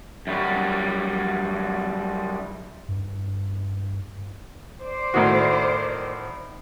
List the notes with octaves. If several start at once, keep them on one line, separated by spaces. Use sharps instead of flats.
F#2 G3
G2
C5 D5
A2 D#3 F#4